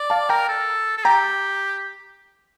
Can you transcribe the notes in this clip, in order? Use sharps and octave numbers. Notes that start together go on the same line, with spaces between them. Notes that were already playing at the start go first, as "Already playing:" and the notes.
Already playing: D5
F5 A5
A#4 G5 A#5
A4
A4
G4 G5 A#5